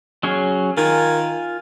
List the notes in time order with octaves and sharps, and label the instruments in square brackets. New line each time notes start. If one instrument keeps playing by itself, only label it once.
[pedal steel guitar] F#3 C#4 G#4
[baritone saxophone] D#3 [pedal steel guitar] F4 G#5